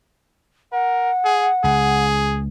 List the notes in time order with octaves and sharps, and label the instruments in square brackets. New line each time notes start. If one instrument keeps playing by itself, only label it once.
[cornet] A#4 [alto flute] F#5
[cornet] G#4
[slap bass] C#2 [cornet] G#4